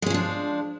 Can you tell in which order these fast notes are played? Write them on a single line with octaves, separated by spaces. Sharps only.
G#3 C#4 F3 D4